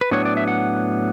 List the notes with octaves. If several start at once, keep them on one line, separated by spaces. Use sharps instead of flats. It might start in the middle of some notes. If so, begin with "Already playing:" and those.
B4
A2 F#3 B3 D4 C#5
D5
E5
F#5